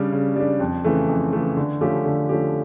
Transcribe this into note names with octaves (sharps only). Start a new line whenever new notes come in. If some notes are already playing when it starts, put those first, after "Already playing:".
Already playing: C#3 G3 D4
C#3
G3 D4
F2
C#3 E3 A3
F2
C#3 E3 A3
D3
F3 A3 C#4 G4
D3
F3 A3 C#4 G4